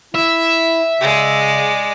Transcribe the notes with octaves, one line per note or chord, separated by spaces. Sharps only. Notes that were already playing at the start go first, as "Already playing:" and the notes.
E4 E5
C#3 G#3 D5